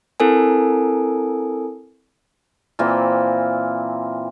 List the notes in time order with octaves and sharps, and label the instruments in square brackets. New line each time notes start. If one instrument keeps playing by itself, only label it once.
[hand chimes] C4 E4 A4 A#4 G#5
[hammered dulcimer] A#2 E3 A#3 C4